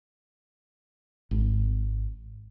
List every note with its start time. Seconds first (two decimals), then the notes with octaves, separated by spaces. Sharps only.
1.31 G#1